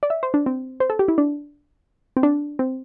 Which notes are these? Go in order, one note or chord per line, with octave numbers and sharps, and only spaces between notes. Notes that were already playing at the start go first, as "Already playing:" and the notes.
D5
E5
C5
D4
C4
C5
A4
G4
E4
D4
C4
D4
C4